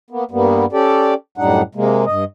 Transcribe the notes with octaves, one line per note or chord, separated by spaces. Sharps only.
A#3 B3
G2 G3 A#3 B3
C#4 G4 A4 D5
F#2 A2 G3 D4 D#4 F#5
C3 G#3 A#3
G2 D#5